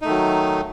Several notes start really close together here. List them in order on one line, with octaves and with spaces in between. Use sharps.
D#4 A3 D#3 F#3